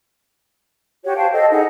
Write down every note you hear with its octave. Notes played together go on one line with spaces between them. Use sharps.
F#4 G4 C#5
C5 F5 G5 A5
A4 D#5
D#4 G#4 F#5